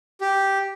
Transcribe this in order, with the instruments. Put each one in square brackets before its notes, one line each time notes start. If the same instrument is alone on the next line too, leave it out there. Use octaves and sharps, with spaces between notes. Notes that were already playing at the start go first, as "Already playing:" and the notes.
[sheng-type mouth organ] G4